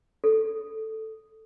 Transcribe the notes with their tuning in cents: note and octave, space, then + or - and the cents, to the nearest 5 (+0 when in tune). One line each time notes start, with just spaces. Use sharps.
A4 +0